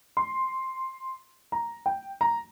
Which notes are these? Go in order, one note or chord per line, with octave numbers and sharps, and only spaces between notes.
C6
A#5
G5
A#5